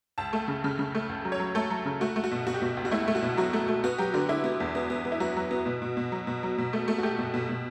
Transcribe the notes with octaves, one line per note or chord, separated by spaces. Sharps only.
C#2 A5
A3
C#3
C#3
C#3
A3
C#2
F#3
C#5
F#3
A3 A4
F#3
C#3
A3 F#4
A3
F#4
B2
B2 F#4
G4
B2 F#4
C#2
F#4
A3 E4
A3
F#4
B2
F#3 F#4
A3
A3
B3 F#4
F#3 G4
D3 F#4
D3 E4
B3
E2
B3
B3
B3
E4
F#3 F#4
F#3
B3
B2
B2
B2
F#3
B2
F#3
B2
A3
A3
F#4
A3 G4
B2
B2
B2